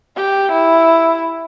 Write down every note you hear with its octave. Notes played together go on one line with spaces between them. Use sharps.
G4
E4